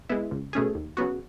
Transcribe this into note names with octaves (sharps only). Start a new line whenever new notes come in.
G#3 B3 E4
C#2
B2 A3 C#4 G#4
D#2
C#3 F#3 B3 F#4